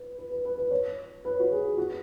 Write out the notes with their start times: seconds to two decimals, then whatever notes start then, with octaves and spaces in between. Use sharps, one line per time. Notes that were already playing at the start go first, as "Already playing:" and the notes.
Already playing: B4
0.18 B4
0.31 B4
0.45 B4
0.58 B4
0.71 C#5
1.25 B4
1.39 F#4
1.51 G#4
1.77 F#4